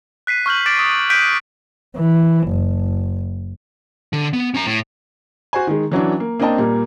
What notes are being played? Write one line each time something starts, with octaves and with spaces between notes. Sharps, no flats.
F#6 B6 C7 D#7
C#6 F6 G6 F#7
D6 A6 D7
D#6
F#6 G6 B6 D7 D#7 F#7
E3
F#1
D3
B3
C#4 A#5
A2
F#4 C5 G#5
D#3 G#3
E3 F#3 C#4 D4
A#3
A#3 C4 D4 D#5 G5 A5
A#2 G3 A#3